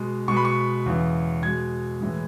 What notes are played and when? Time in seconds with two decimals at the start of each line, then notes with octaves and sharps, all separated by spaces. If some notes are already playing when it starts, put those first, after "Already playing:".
Already playing: B2 G#3
0.28 B2 G#3 C#6
0.37 B5
0.45 C#6
0.86 E2 C#3 E3
1.43 B2 G#3 G#6
2.01 A2 E3 G#3